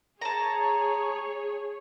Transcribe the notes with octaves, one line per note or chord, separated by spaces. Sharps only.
G#4 C#5 A5 A#5